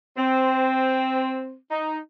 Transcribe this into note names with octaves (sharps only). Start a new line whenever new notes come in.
C4
D#4